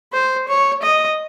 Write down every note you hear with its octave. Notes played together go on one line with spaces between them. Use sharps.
C5
C#5
D#5